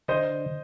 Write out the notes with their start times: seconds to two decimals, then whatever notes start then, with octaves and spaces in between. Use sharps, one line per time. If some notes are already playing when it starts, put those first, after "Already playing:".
0.08 D3 C5 D#5